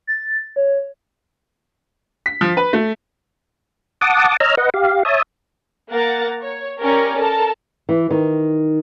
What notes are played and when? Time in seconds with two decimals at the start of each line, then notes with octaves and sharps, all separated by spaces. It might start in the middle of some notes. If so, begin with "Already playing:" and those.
0.07 A6
0.56 C#5
2.26 B6
2.41 F3
2.57 B4
2.73 A3
4.01 F#5 A5 D6 D#6
4.40 C#5 D#5 A#5 E6 F6
4.57 B4 D#5 F#5
4.74 G4 F5
5.05 C#5 E5 A5 D#6
5.90 A#3 A#4 F#5 A#5 A6
6.42 C#5
6.80 C#4 G4 A#4 D5 C#6
7.18 A4 A#4 A5
7.89 E3
8.11 D#3